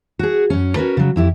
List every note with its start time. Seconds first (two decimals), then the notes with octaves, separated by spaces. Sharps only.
0.19 F#4 G#4
0.50 F#2 C#4
0.76 C#4 F#4 A#4 B4
0.97 C#3 F#3
1.16 F2 E4 G4